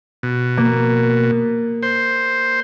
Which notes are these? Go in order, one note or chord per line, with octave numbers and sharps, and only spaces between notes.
B2
A#3
C5